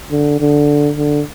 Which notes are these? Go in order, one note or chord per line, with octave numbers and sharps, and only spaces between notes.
D3
D3
D3